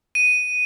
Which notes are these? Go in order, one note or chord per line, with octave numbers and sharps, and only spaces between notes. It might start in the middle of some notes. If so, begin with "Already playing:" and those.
D#7